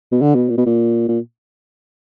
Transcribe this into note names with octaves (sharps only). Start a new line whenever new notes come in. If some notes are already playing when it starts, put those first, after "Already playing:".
B2
D3
B2
A#2
B2
A#2
A#2